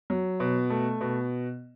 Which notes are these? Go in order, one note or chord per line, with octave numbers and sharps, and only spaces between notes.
F#3
B2
A3
B2